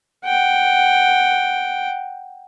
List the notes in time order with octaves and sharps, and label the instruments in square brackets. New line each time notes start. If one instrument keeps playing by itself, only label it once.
[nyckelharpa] F#5 G5